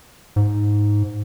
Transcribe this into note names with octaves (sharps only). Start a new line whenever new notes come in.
G#2